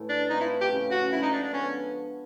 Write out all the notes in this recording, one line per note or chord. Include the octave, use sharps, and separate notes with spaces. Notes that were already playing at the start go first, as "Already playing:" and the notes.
Already playing: A2 E3 A3
D4
E3 A3 C4 D#4 F4
E4
G4
C#3 F3 A3 C#4
F#4
D3 F3 G#3 E4
D#4
D4
D4
D3 F3 G#3 B3 C#4